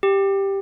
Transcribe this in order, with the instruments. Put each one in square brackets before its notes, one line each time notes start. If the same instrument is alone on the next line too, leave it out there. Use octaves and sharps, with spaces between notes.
[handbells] G4